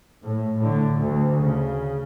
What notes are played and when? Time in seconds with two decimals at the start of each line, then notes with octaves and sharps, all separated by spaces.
0.23 A2
0.57 A2 D3
0.99 D2
1.37 C#3